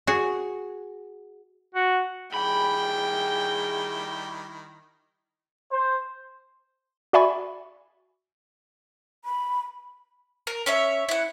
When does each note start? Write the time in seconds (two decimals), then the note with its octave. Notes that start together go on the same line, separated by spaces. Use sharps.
0.07 F#4 G#4
1.75 F#4
2.34 D#3 G3 E4 G#4 G5 B5
5.71 C5
7.13 F#4 D5 E5 G#5 B5 C#6
9.25 B5
10.47 A#4
10.66 C#4 C#5 E5
11.09 E4 F#5